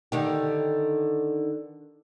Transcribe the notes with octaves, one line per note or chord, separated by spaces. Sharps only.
D3 D#3 G4